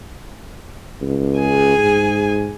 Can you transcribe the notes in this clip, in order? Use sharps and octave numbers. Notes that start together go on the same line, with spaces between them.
C#2
G#4 G#5
G#2